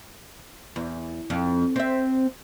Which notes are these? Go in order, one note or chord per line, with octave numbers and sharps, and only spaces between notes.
E2
F2
C4 E5